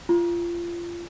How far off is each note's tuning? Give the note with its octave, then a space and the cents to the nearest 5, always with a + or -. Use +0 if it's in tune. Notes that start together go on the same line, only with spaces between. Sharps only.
F4 -25